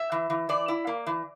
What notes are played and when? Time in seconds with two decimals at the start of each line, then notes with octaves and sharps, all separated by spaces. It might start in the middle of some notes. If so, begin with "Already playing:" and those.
Already playing: E5
0.12 E3
0.30 E3
0.49 E3 D5
0.68 E4
0.87 A#3
1.06 E3